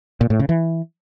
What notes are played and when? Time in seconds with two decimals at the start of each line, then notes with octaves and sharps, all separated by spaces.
0.21 A#2
0.30 A2
0.39 C#3
0.49 E3